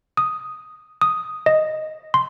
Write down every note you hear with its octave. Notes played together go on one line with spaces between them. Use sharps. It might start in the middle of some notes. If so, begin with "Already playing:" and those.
D#6
D#6
D#5
C6